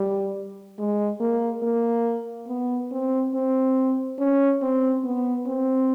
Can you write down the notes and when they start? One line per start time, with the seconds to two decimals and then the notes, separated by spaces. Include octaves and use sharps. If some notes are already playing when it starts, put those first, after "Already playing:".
Already playing: G3
0.79 G#3
1.20 A#3
1.63 A#3
2.48 B3
2.91 C4
3.34 C4
4.19 C#4
4.62 C4
5.04 B3
5.46 C4